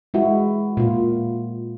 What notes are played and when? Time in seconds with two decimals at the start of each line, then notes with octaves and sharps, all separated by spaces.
0.14 G#3 E4 F#4
0.77 A#2 F4